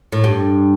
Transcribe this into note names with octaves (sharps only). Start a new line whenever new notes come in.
A2
G2